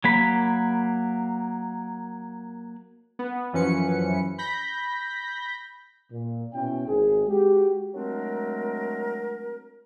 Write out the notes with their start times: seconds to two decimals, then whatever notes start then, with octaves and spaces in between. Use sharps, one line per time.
0.04 F#3 A#3 B5
3.19 B3
3.53 F#2 E3 F3 C#4 B4 C#7
4.38 B5 G6 A#6 B6
6.12 A#2
6.54 B2 C#4 E4 G5
6.88 G#1 G#4
7.28 G#3 F#4 G4
7.93 F#3 G#3 A3 C4 D4 A#4